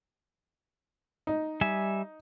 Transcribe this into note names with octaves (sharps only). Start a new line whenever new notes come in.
D#4
G3 E5 G#5